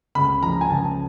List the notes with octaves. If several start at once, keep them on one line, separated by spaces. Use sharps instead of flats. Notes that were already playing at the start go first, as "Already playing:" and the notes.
C#2 B5
F3 A#5
G#5
C#2 A5